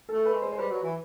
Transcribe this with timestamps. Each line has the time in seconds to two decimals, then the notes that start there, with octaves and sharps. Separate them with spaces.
0.09 A3 A4
0.25 B4
0.33 G#3
0.42 C5
0.52 C5
0.58 G3 B4
0.70 F#3
0.82 E3